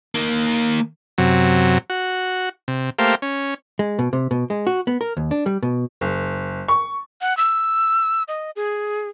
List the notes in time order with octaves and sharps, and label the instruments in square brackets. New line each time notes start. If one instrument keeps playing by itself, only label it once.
[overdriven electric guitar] D#3 A#3
[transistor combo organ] F#2 C3 F#3
F#4
C3
A3 A#3 G4 C5 F5
C#4
[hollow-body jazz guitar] G#3
B2
C3
B2
G#3
F#4
B3
A#4
D#2
D4
G3
B2
[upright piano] F#1
C#6
[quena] F#5
E6
D#5
G#4